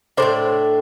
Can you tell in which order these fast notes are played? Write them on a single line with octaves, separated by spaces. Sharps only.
G#3 D4 C5 A2